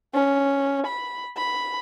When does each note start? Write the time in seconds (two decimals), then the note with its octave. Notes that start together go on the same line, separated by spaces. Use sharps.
0.14 C#4
0.86 B5
1.37 B5